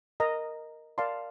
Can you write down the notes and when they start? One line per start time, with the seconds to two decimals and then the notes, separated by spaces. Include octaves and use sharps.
0.20 A#4 D#5 A#5
0.98 A#4 D5 F5 A5 C6